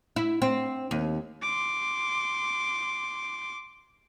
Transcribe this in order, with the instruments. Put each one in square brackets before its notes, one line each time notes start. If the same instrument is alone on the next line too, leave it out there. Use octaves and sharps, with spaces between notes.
[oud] E4
C4
D#2
[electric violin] C6 D6